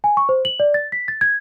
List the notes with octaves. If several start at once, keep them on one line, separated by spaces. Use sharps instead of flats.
G#5
C#6
C5
F#7
D5
A6
B6
A6
G#6